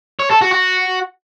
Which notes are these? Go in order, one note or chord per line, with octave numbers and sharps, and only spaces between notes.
C#5
A4
F#4
F#4